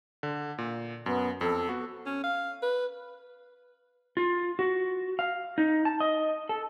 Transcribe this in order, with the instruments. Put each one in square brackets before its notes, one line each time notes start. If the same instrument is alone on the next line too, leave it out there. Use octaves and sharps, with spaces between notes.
[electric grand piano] D3
A#2
[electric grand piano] F#2 [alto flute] B3
[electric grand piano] F2 [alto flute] A4
[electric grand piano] B3 F#4
[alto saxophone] C#4
F5
B4
[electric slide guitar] F4
F#4
F5
D#4
A5
D#5
A4